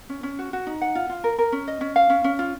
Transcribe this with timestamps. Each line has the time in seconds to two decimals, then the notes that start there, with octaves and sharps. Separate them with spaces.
0.09 C#4
0.23 C#4
0.39 F#4
0.53 F#4
0.67 D#4
0.81 F#5
0.95 F4
1.09 F4
1.24 A#4
1.39 A#4
1.52 C#4
1.68 D#5
1.81 C#4
1.96 F5
2.10 C#4
2.24 C#4
2.39 F4